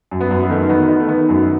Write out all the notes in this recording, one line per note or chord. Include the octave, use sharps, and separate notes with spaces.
F#2
B3
F#2
B3
D#3 A3
D#3 B3
D#3 B3
A3
D#3 B3
F#2